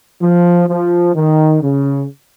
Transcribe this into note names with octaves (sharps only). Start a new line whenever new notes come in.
F3
F3
D#3
C#3